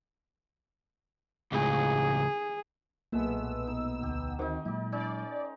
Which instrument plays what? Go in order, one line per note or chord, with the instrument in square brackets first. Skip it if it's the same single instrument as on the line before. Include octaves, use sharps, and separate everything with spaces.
[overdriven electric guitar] C#2 A2 [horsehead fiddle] G#4
[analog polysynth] B1 B3 E6 [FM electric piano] A#2 [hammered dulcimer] G#3 A3 B4
[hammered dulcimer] D#4
[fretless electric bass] D2 [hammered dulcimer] G4
[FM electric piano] D#3 C4 F#4 [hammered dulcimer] D#4 G4
[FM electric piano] A#2 [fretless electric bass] F#3 G#3 [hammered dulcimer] D#4 D5
[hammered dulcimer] C#4 D#4 C5 [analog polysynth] D5